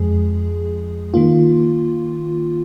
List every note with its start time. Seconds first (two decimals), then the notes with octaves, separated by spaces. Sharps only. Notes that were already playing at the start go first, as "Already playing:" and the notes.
Already playing: F2 F3 G#3 G#4
1.14 D#3 A#3 F4